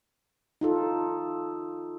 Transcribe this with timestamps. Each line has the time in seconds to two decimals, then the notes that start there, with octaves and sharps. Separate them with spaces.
0.61 D#4 F4 A4